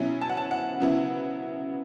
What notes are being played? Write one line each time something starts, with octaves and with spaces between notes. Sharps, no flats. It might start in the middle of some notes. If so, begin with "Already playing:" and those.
Already playing: B2 F#3 C#4 E4
A5
F#5
A5
F#5
C#3 F#3 B3 E4